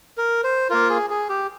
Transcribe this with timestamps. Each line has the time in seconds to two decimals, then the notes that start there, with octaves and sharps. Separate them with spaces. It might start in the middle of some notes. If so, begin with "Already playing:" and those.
0.18 A#4
0.44 C5
0.70 A#3 F4 A#4
0.90 G#4
1.10 G#4
1.29 G4